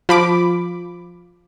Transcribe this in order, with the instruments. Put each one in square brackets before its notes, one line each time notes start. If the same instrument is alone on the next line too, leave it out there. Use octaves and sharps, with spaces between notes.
[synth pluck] F3 B5 D6